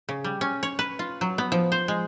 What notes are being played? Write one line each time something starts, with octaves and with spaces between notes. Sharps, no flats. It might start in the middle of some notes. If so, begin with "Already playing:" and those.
C#3
G3
C#4
C#5
B4
F4
F#3
B3
F3
C5
G#3